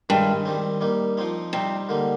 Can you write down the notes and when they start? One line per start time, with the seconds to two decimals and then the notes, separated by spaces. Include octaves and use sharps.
0.09 G2 D#3 G#3 D#4
0.45 D#3 G3 C4
0.81 G3 A#3 D#4
1.17 F3 C4 D#4
1.53 C3 G3 C4 D#4
1.89 D3 G3 A#3 D#4